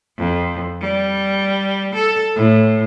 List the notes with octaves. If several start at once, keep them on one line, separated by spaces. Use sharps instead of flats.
F2
G3
A4
A2